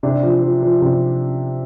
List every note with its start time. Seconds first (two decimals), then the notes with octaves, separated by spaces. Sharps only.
0.03 C3 D4
0.23 F3
0.42 F3
0.63 F3
0.81 C3